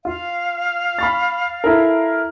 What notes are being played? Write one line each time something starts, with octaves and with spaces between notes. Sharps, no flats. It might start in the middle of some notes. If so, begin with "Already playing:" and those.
F4 F5
B5 C#6 A6
E4 A4 A#4